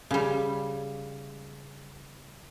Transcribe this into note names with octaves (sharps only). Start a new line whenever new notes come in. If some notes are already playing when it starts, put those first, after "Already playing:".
C#3 G3